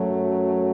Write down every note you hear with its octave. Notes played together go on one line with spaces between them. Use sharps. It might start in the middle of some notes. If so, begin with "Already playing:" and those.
Already playing: F#2 F#3 A3